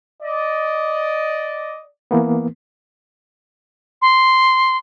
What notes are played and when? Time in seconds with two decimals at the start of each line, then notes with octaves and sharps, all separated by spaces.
0.21 D5 D#5
2.11 E3 A#3 B3
4.02 C6